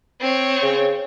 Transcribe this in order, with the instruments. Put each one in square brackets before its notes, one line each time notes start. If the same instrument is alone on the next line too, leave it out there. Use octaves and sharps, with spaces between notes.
[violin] C4 C#5
[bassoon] C#3